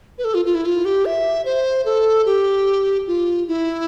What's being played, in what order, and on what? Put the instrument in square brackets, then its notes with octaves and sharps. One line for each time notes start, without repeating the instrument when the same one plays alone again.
[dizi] B4
A4
F4
F4
E4
F4
G4
E5
C5
A4
G4
F4
E4